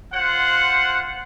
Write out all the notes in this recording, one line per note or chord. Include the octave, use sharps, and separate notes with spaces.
F4 C5 F#5